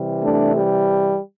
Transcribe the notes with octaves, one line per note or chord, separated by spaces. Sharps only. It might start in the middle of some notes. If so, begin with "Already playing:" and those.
Already playing: C3 E3 G3
A3 D4
G3